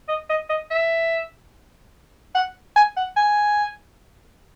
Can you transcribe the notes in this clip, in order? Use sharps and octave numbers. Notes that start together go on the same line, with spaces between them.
D#5
D#5
D#5
E5
F#5
G#5
F#5
G#5